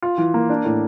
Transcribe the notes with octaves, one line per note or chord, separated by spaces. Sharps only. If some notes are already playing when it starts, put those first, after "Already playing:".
F4
E3
A#3
D4
A2